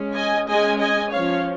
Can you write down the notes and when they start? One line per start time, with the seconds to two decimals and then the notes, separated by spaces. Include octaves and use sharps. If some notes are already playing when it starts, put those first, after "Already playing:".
Already playing: G#3 C#4
0.17 D#5 G#5
0.49 G#3 C#4 D#5 G#5
0.81 D#5 G#5
1.14 F3 C#4 C#5 F5